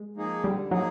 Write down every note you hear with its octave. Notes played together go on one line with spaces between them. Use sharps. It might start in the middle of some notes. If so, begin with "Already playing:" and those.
Already playing: G#3
F3 A#3 D#4 G#4
D3 G3
F3 F#3 A#3 D#4 G#4